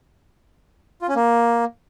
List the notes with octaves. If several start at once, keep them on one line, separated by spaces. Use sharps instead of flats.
F4
C#4
A#3